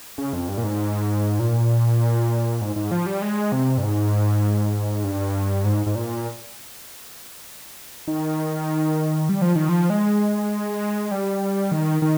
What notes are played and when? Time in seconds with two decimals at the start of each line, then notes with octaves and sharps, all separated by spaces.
0.18 C#3
0.33 F2
0.49 G2
0.58 A#2
0.64 G#2
1.39 A#2
2.61 G#2
2.76 G#2
2.91 F3
3.06 G3
3.22 G#3
3.52 C3
3.78 G2
3.83 G#2
5.04 G2
5.64 G#2
5.87 G#2
5.95 A#2
8.07 D#3
9.29 G3
9.42 F3
9.56 D#3
9.69 F3
9.90 G#3
11.11 G3
11.72 D#3
12.02 D#3